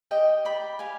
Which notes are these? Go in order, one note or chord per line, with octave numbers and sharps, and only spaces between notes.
G4 D#5 G5
D5 G5 B5
G4 F5 G#5